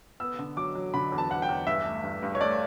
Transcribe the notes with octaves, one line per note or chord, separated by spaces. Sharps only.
B3 E6
D3
F#3 D6
F#3
D3 B5
E2
A5
E2 F#5
G5
E2
G2 E5
A3
G2
G2
C#5
A3 D5